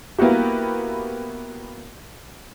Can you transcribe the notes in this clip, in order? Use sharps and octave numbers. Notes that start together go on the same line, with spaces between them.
A#3 B3 E4 F#4 G4